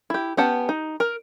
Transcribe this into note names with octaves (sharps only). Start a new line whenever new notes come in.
E4 G4
B3 C#4 G4 F#5 A5
D#4
A#4